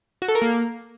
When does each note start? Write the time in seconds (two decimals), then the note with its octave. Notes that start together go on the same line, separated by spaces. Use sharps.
0.22 F#4
0.28 A4
0.35 A#4
0.42 A#3